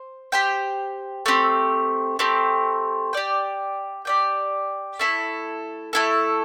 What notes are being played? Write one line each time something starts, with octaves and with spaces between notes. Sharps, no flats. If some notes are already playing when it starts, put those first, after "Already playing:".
Already playing: C5
G4 C5 G5
A3 C4 G4
A3 C4 G4
G4 D5 G5
G4 D5 G5
A3 E4 A4
A3 E4 A4